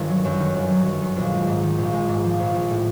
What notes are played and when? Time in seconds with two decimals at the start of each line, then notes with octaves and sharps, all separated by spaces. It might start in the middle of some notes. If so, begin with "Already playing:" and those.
Already playing: G1 D#3
0.09 F#3
0.25 F#2
0.40 D#3
0.55 G1
0.71 F#3
0.86 F#2
1.01 D#3
1.17 A#1
1.32 G#3
1.47 G#2
1.63 D#3
1.78 A#1
1.93 G#3
2.08 G#2
2.24 F3
2.40 A#1
2.55 A#1
2.70 A2